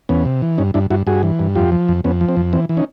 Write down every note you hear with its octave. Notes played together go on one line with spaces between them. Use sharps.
E2 B3 C#4
C3
E3
G2 C#4 D#4
G2 D4 E4
G2 E4 F#4
G2 F#4 G#4
E3
G2
F2 F4 G4
F3
F2
F2 B3 C#4
F3
C4
F2
E3 C4
E3
C#4 D#4